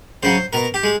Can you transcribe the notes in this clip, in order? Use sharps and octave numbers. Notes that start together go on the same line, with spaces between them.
C#3 F#3 C5
B2 A#4
G4
G#3